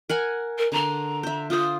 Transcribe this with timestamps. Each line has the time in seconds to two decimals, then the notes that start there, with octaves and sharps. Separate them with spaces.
0.09 A#4 F#5 G#5
0.58 A#4
0.72 D3 A#5 C6
1.23 C5 E5
1.50 F4 C5 D#6